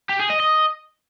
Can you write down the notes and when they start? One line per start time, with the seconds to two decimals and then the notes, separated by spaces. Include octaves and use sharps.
0.09 G4
0.20 G#4
0.30 D#5
0.40 D#5